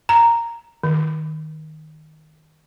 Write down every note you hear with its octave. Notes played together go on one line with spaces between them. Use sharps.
A#5
D#3